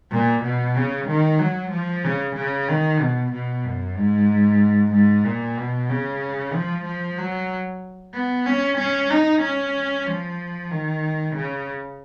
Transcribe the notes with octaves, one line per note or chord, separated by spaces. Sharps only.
A#2
B2
C#3
D#3
F#3
F3
C#3
C#3
D#3
B2
B2
F#2
G#2
G#2
A#2
B2
C#3
F3
F3
F#3
B3
C#4
C#4
D#4
C#4
F3
D#3
C#3